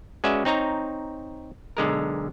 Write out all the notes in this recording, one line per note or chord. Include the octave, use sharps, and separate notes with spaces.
G#3 C#4 F#4 B4 D5 E5
C4 D#4 C#5 A#5
B1 D3 G#3 A#4